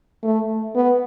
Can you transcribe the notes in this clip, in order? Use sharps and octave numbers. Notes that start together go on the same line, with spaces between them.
A3
B3